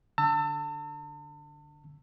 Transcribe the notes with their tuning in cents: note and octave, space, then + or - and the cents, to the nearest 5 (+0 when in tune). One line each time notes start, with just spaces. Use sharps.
D3 +0 A5 +40 E6 +0